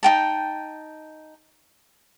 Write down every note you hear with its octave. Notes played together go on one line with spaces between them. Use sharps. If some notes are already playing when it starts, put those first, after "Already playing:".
D#4 G5 A5